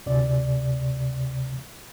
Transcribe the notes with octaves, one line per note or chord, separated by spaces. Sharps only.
D2 C3 D5